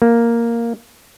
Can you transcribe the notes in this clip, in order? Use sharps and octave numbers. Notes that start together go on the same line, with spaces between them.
A#3